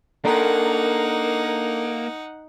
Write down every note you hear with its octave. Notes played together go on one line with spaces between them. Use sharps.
A#3 D4 D#4 A4 A#4 F#5